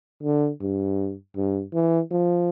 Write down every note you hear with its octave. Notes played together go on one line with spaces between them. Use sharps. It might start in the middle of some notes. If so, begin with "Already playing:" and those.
D3
G2
G2
E3
F3